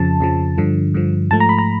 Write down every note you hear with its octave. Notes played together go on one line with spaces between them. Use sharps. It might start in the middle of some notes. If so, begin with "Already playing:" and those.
Already playing: F2 C#3 F3 A5
F2 C#3 F3
G2 D3 F3
G2 D3 F3
G#2 F3 A3 A5
A#5
B5
A#5